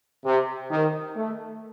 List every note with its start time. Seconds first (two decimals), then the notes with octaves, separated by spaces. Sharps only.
0.25 C3
0.71 D#3
1.17 A3